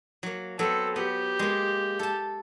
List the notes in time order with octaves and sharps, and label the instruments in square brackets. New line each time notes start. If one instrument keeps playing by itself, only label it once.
[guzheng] F#3 A#3
[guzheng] F#3 B3 C4 [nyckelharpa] A4
[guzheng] B3 [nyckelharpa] G4
[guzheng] G#3 A#3
A4 A5